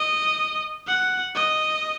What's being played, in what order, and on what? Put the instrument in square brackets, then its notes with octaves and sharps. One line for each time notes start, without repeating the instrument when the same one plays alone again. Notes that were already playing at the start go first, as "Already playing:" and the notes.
Already playing: [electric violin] D#5
F#5
D#5